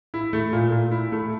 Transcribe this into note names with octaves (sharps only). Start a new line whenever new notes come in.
E4
A3
A#2
A#2
E4
A3